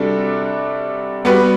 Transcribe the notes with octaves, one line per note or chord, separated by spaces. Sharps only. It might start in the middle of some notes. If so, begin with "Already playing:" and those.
Already playing: C3 G3 D4 F#4 A4
G3 B3 F#4 B4